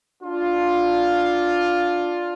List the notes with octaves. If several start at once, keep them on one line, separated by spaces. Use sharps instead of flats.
D4 F4